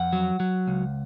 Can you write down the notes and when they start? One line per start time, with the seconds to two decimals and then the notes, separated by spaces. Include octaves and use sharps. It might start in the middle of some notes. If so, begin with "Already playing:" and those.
Already playing: F2 F#5
0.13 F#3
0.40 F#3
0.67 C#2